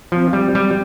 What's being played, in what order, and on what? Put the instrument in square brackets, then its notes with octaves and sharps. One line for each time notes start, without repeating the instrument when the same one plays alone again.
[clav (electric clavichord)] F3 [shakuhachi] C4
[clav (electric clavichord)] G3
G3